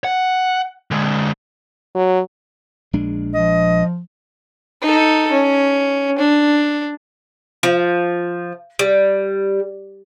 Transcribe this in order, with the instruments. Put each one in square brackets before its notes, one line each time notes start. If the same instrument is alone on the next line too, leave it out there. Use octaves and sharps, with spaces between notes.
[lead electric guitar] F#5
D3 G#3
[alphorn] F#3
[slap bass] A#1 G#3 D4
[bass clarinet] F3 [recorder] D#5
[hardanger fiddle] D#4 A4
C#4
D4
[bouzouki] F3
G3